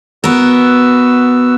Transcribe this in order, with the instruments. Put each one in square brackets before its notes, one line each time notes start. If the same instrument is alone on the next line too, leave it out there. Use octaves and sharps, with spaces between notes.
[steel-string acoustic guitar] B3 A#4 [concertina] F#4 B4 E6